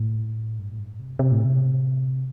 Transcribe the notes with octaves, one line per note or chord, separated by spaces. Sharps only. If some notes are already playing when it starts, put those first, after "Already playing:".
Already playing: A2
G2
A2
G2
C3
C3
A2
C3